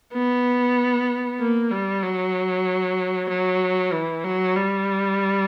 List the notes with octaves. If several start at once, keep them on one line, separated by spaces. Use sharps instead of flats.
B3
A#3
G3
F#3
F#3
E3
F#3
G3